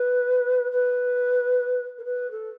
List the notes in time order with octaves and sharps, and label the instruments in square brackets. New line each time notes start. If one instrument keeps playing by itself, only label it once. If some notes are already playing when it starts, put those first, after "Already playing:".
Already playing: [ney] B4
B4
A#4
B4
A4